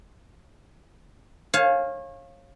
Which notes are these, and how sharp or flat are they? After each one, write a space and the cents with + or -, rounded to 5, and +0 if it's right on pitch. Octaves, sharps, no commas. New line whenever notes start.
C#5 -30 F5 +0 G#5 +30